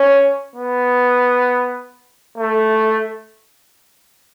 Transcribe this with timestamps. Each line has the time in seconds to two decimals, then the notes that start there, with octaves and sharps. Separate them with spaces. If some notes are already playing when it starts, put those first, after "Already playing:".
Already playing: C#4
0.56 B3
2.38 A3